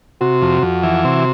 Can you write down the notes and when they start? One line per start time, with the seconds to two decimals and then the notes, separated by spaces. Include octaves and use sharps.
0.21 C3 F#4
0.42 F2
0.63 F2
0.83 E3
1.05 C3